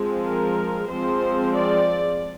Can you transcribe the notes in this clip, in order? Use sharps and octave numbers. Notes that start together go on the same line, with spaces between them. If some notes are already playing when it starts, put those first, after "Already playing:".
Already playing: F3 G#3 C4
A#4
F3 G#3 C4 C5
D5